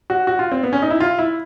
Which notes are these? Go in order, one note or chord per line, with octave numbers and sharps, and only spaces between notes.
F#4
F#4
F4
C4
B3
C#4
D#4
E4
F4
E4